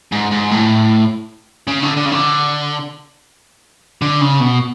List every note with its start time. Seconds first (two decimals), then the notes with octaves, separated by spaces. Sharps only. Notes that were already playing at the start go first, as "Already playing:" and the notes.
0.12 G#2
0.31 G#2
0.51 A2
1.68 C#3
1.83 D3
1.97 D3
2.06 C#3
2.12 D3
4.02 D3
4.21 C#3
4.40 B2